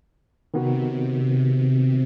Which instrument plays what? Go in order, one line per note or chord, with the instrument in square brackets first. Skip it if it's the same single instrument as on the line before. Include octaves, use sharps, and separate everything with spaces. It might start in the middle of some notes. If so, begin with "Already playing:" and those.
[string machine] C3 [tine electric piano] D#3 B3 F#4